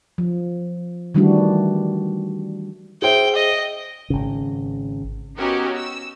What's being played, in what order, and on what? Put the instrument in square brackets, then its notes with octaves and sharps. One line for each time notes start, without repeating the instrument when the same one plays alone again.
[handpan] F3
D#3 E3 G3 A3 D4 F#4
[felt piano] G#4 C5 E5 [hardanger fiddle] G5
[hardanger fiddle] D#5
[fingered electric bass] G#1 C#3
[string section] B3 C#4 D#4 F#4 G4 A#4
E6